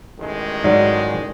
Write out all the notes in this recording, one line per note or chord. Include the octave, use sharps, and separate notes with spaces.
A1 D#3 G#3
G#2 F#3 D5